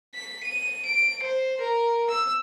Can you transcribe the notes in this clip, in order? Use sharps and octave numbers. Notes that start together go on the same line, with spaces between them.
B6
D#7
D7
C5
A#4
E6